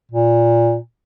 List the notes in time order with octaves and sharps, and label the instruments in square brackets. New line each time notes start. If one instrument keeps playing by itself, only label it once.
[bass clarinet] A#2